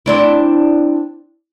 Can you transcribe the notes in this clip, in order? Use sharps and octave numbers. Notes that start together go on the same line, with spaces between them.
C4 D4 E4